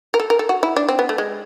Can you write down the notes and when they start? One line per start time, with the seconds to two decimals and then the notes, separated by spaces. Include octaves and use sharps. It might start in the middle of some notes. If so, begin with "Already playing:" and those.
0.14 A#4
0.20 A4
0.30 A#4
0.39 A4
0.49 F#4
0.63 E4
0.76 D4
0.89 C4
0.99 B3
1.09 A3
1.18 G#3